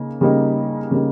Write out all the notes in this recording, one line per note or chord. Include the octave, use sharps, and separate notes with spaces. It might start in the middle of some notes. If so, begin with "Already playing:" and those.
Already playing: C#3 A#3 D#4
C#3 G3 A#3 D#4
C#3 G3 A#3 D#4